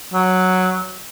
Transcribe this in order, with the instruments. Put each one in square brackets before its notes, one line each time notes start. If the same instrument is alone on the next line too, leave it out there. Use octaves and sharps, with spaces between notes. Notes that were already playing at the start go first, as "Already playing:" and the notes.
[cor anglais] F#3